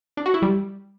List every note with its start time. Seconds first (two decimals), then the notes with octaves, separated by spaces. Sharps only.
0.17 D4
0.26 F#4
0.34 E4
0.42 G3